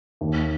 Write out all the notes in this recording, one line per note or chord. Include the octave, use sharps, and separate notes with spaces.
D#2